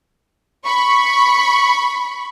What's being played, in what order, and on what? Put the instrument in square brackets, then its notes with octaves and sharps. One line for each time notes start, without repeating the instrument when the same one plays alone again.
[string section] B5 C#6